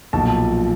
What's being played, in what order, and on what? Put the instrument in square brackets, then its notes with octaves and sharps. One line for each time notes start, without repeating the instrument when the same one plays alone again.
[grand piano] B1 A#2 F3 A5